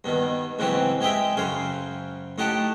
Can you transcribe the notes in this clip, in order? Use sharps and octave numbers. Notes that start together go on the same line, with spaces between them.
G2 B2 D#3
G#2 C#3 E3 F#3 C4 G4
G#3 G4 D#5 E5 G5
F#2 C#3 C5 F5
A2 D#4 G4 F#5 A5 D6